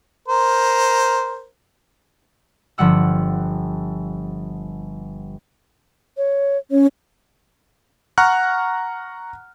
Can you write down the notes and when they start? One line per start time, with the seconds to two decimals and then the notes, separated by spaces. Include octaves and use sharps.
0.28 A#4 C5
2.78 G1 F3 G3 F#5 E6
6.17 C#5
6.71 C#4 C#5
8.18 F#5 A#5 C#6 F6 F#6